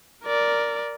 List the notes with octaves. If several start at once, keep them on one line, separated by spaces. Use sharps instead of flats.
A#4 D5